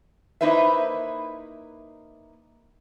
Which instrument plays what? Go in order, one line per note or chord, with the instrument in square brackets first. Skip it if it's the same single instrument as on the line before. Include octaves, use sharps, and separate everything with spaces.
[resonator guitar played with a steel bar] A#3 D#4 E4 B4 C5 E5